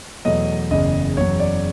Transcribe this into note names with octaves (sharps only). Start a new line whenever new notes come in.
E2 B2 F#3 A3 D#5
F#1 E2 C#3 D#5
F#1 E2 C#3 F#3 C#5
D5